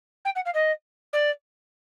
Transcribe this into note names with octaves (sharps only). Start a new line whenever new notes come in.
G5
F#5
F5
D#5
D5